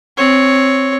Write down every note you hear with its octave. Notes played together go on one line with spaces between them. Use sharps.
C4 C#5